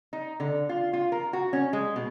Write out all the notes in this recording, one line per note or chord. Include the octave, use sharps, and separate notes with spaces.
D#4
D3
F4
F4
A#4
F#4
C#4
G#3
B2